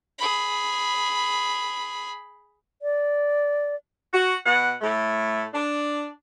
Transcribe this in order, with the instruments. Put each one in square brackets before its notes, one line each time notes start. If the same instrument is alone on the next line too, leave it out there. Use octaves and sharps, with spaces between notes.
[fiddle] G#4 B5
[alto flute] D5
[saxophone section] F#4
B2 F#5
A2 A3
D4